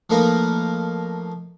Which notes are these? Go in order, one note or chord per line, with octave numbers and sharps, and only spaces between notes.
F3 A3 A#3 D#4 A#4 B4